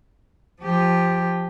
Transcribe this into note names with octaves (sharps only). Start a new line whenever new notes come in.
F3 G4